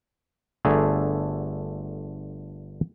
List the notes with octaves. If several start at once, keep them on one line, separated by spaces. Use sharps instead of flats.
G1 D3 A3 G#4 A#5